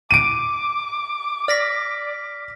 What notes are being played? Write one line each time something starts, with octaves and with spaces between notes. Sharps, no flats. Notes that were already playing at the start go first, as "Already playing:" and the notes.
D6 D7 D#7
D5 F6 A#6 B6